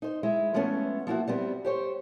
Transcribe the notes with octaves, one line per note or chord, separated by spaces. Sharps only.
D#4 C5
G#3 E4
F3 G#3 A3 B3 C#4
F3 A#3 E4 F#4
G3 B3 C4
G4 C5 C#5